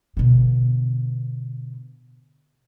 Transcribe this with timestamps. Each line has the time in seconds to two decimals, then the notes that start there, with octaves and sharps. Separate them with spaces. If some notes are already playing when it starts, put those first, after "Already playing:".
0.17 B2 D3